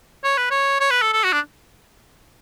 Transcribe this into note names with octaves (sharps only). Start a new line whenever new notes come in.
C#5
B4
C#5
C#5
B4
A4
A4
F#4
D4